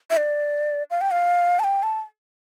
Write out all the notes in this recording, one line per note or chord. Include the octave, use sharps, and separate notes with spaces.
E5
D5
F5
G5
F5
A5
G5
A5